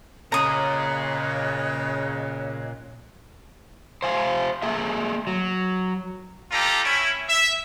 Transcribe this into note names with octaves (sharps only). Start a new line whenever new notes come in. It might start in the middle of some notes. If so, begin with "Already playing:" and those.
A#2 C#3 C#5 D#5 A#5 D#6 F#6
C5 F5 G#5
A3 A#3 G#4 E5
F#3
D4 F4 G4 A4 A#5
C#4 E4
E5